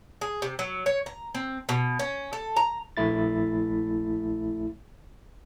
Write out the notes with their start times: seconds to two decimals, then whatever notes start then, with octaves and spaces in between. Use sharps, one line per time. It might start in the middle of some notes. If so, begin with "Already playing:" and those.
0.21 G#4
0.42 C3
0.59 F#3
0.86 C#5
1.06 A#5
1.35 C4
1.69 B2
1.99 C#4
2.33 A4
2.56 A#5
2.97 A#1 A3 E4 A6